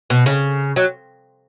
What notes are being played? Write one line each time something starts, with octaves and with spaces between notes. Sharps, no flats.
B2
C#3
F#3